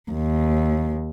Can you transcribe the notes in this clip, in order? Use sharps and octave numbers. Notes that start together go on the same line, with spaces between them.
D#2